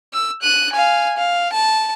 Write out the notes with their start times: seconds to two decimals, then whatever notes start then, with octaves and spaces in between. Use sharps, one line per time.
0.13 E6
0.42 F#6 D#7
0.73 F5 G#5
1.17 F5
1.53 A5